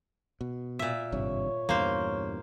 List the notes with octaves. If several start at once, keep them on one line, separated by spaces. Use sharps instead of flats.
B2
A#2 E5
G#1 G2 C3 C#5
E2 G2 A#3 C5